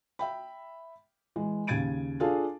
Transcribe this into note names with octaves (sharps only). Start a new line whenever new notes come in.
E5 G5 B5
E3 G#3
D#2 C#3 G#6 A6 D7 D#7
D4 F4 G#4 A4 F5 A5